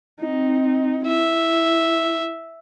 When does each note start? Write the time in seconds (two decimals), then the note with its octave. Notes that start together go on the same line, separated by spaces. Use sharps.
0.21 C4 D#4
1.07 E4 E5